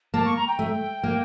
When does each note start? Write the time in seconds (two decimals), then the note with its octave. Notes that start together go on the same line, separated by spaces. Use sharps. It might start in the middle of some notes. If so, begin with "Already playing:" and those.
0.14 A#3 A5
0.25 C#6
0.36 A#5
0.47 G5
0.59 A3
1.03 A#3